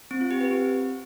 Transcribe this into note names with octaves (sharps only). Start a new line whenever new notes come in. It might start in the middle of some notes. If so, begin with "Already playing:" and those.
C4
F4
G4
B4
C4